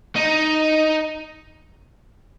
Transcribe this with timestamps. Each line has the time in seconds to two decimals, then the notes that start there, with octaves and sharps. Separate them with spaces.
0.16 D#4